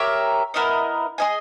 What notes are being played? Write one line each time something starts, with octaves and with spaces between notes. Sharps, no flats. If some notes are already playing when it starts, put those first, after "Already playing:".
Already playing: G4 A#4 C#5 E5
B3 E4 A#4 D#5
G#4 D#5 G#5